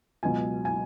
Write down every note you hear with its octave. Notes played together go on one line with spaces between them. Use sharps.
C#2 B2 F#3 G#5
G#5